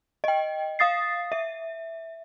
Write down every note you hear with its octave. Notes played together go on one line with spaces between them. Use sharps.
D#5 G5
F5 D#6 A6 C7
E5